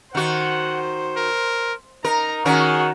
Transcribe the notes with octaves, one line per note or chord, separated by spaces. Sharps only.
D#3 F#4 C5 F#5
A#4
D#4 A#4 A#5
D#3 C#4 F#4 G#4 A#4